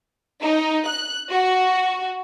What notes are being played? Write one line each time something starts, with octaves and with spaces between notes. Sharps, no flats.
D#4
F#6
F#4